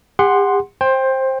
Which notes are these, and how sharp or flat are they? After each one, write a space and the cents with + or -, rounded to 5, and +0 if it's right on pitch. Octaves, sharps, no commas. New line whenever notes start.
G4 +45 F#5 +0 C6 +0
C5 +15 G5 +15